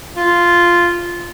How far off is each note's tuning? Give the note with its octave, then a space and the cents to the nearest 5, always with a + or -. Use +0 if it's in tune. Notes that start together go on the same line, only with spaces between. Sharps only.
F4 -5